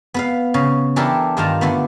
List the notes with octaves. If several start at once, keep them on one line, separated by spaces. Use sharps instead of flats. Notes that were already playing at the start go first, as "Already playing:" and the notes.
B3 B4 F5
C#3
E3 D4 E4 G4 A4 A#4
G2 D#3 F4 A#4 A5 A#5
D3 A3 B3